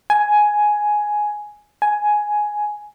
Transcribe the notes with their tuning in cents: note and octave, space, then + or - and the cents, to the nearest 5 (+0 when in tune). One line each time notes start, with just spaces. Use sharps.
G#5 +10
G#5 +10